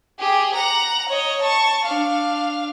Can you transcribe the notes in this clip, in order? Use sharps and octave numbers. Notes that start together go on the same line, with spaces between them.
G4 G#4
F#5 A#5
C#5 D#5
A5 C#6
D4 F5